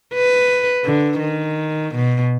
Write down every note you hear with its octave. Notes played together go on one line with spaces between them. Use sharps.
B4
D3
D#3
B2